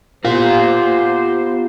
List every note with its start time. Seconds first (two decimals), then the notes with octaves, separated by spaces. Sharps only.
0.25 B3 F4 G4 A#4 C5 F5